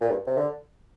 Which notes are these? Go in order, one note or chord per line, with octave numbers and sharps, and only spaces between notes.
A#2
G2
C3
D3